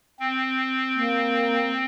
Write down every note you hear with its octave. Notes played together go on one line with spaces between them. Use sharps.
C4
A#3